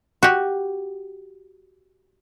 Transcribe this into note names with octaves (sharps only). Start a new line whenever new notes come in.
F#4 G4